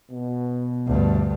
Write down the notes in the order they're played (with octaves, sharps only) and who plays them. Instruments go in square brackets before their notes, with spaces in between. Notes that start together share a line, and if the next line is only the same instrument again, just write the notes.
[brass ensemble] B2
[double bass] D2 G2